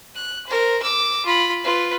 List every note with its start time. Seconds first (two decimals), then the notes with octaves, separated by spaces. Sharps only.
0.15 F#6
0.46 A#4 C5
0.82 D6 E6
1.25 F4 B5
1.64 F4 B4